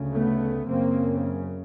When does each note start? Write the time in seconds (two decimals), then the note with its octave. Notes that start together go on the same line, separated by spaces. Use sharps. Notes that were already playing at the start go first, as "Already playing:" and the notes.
Already playing: D2 C#3
0.12 A3 B3
0.67 F#2 C#3 A#3 C4